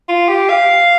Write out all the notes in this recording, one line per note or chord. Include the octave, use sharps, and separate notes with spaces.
F4
G4
F5